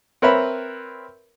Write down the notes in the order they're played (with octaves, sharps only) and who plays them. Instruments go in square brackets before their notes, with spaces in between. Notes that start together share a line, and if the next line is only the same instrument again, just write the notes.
[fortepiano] C4 A#4 B4 C#5 E5 B5